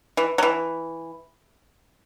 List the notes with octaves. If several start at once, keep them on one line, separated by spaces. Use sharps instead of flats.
E3
F#3
E3